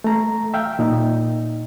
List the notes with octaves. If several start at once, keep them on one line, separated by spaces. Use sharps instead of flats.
A3 A#5
E5 F5 G5
A#2 D#4